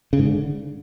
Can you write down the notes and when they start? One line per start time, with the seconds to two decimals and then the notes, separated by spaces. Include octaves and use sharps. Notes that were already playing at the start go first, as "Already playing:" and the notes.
0.13 C#3
0.19 G#2
0.25 D3